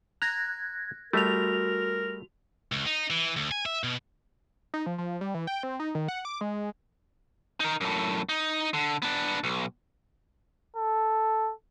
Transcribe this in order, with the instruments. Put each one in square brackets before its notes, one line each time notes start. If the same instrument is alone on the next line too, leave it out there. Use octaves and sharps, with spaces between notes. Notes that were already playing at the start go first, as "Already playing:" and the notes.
[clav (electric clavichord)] A#5 [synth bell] F#6 G#6 A#6
[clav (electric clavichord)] G3 A3 [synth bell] F#4 F7 [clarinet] A#4
[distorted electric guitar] C#2
D#4
E3
D2
G#5
E5
B2
[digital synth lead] D#4
F3
F3
G3
E3
G5
C4
D#4
D#3
F#5
D6
G#3
[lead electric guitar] D#4 A#4
F#2 A2
D#4
D3
B3 D4
B1
[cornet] A4